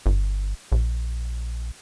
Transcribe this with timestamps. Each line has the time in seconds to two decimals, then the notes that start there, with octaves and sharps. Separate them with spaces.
0.06 G1
0.72 A#1